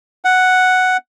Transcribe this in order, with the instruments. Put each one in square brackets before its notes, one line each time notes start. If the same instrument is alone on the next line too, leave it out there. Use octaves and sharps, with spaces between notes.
[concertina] F#5